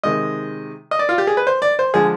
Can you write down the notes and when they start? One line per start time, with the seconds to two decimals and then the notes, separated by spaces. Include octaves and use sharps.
0.03 C3 D#3 G#3 D#5
0.91 D#5
0.99 D5
1.09 F4
1.18 G4
1.27 G#4
1.37 B4
1.47 C5
1.62 D5
1.79 C5
1.94 D3 F3 G#3 G#4